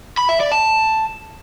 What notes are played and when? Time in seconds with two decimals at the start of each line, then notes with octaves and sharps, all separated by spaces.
0.17 B5
0.29 E5
0.40 D5
0.52 A5